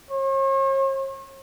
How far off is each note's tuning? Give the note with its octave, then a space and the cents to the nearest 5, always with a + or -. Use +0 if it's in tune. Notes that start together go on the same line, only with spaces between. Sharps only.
C#5 -45